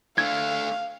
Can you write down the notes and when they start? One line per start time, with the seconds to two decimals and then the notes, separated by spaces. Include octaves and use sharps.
0.18 A3 D4 F5 G#6